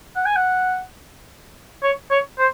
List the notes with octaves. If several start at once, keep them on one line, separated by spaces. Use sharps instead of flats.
F#5
G#5
F#5
C#5
C#5
C5